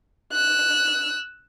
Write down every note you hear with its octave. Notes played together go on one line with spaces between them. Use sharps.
E6 F#6